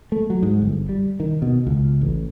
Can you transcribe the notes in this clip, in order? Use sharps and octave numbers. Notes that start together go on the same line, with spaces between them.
A3
F#3
G#2
G1
G3
D#3
B2
C#2
A1